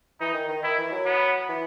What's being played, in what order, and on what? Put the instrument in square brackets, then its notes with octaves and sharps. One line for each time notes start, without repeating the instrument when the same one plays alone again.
[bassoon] E3 [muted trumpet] D#4
[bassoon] D#3
D#3
[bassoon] D#3 [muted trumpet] E4
[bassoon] E3
F#3
[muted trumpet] B3
[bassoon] E3